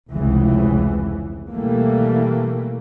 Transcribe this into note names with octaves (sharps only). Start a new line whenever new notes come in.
F1 C#2 C#3 E3
B2 E3 G3 A3 A#3